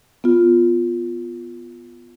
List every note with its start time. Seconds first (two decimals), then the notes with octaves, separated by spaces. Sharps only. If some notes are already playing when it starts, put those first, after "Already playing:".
0.24 B3 F4